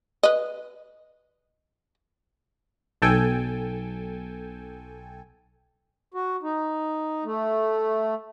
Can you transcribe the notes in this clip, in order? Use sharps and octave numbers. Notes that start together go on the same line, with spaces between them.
B4 D#5
B1 A4 G5 G#5
F#4
D#4
A3